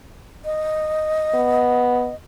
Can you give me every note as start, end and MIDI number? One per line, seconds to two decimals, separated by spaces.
0.45 2.15 75
1.35 2.10 59